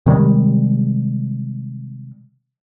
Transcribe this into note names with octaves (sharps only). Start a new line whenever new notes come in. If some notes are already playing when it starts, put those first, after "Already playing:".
C3 D#3 G3 G#3